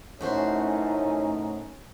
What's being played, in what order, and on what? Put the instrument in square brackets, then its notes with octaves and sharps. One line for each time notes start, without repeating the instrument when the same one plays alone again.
[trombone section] F#2 A3 C#4 [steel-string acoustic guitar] A2 F#4 C5 [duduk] D#4